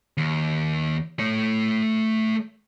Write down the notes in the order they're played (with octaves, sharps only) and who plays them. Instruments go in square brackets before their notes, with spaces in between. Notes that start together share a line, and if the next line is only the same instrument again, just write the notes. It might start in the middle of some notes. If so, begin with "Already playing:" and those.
[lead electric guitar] D#2
A3 C#5